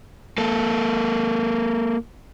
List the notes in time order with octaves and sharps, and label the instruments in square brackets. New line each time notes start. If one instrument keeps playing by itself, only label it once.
[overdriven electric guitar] A#3 A4